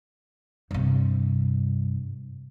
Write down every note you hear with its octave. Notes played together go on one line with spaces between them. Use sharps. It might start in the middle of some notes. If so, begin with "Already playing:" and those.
G2 C3